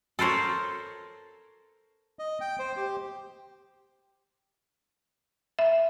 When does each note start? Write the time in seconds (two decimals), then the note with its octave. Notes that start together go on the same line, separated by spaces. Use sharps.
0.19 A4 A#4 C5 C#5
2.19 D#5
2.41 G5
2.59 C5
2.77 G4
5.59 E5